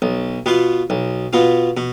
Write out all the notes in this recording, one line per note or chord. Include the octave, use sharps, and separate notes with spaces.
B1
B2 B3 F4
B1
B2 B3 F4
B2